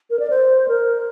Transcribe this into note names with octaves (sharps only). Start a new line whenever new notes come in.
A#4
D5
C5
A#4